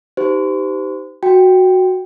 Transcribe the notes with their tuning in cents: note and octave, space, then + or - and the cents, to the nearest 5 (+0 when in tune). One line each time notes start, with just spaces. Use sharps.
D#4 +15 G4 -15 C5 -40
F#4 +0 G5 +0